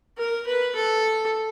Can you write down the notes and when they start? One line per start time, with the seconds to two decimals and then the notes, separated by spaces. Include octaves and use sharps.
0.18 A#4
0.47 B4
0.75 A4